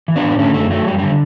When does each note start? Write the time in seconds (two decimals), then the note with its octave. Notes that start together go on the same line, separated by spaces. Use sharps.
0.08 E3
0.16 B3 D4
0.24 A2
0.39 D3 A3 C#4
0.54 F#2 A3
0.70 F#3 A3
0.86 F#2 G3
0.98 D3 G3